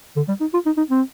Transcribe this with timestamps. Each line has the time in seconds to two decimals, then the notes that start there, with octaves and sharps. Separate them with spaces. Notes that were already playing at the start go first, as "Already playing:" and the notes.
0.16 D3
0.28 G3
0.41 D#4
0.54 F4
0.66 D#4
0.78 D#4
0.91 C4